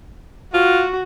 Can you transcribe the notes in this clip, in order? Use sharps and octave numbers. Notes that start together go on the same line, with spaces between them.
F4 F#4